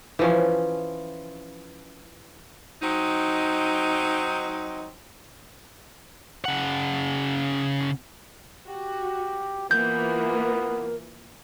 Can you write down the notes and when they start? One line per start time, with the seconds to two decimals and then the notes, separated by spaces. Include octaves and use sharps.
0.19 E3 F3 C#4
2.81 F#3 C4 D#4
6.45 C#3 F#5
8.68 F#4 G4
9.71 E3 A#3 B3 F4 A#4 G6